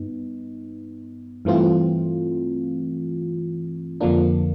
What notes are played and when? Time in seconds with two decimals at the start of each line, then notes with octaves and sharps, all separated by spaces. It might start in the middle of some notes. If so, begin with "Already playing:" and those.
Already playing: G2 B3 D#4
1.45 G2 E3 A3 C4 F4
4.01 F2 D3 F3 A#3 D4